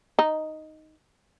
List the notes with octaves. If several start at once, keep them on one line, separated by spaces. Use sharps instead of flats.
D#4